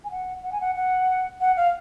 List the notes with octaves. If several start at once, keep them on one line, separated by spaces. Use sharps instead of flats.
G#5
F#5
F#5
G#5
F#5
F#5
F#5
F5